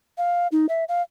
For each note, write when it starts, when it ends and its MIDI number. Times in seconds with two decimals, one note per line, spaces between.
0.18 0.47 77
0.52 0.66 63
0.69 0.84 76
0.88 1.02 77